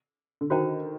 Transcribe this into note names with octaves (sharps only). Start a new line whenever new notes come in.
D3
D#3 F#4 C5 G5 A#5